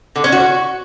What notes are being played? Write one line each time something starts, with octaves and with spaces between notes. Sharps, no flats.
D3
C#4
F#4